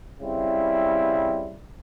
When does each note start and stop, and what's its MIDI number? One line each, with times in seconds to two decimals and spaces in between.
0.20 1.54 49
0.20 1.54 55
0.20 1.54 60
0.20 1.54 64